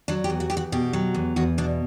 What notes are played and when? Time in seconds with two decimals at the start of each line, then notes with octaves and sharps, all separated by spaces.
0.08 F#3 D4
0.24 G4
0.30 E2
0.40 F#4
0.50 E2 G4
0.57 F#4
0.72 B2 G4
0.93 F#3
1.14 E2
1.36 E2 F#4
1.58 B2 D4